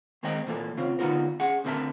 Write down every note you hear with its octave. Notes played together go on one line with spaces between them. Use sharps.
D#3 G#3 A#3 C4 D#5 G5
A#2 E3 A#3 A4
C#3 C4 F4
D3 B3 D#4 F4 F#4 A#4
C#4 G#4 F#5
D2 D3 C4 A#4 E5 A5